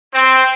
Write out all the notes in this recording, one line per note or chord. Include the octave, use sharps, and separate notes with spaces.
C4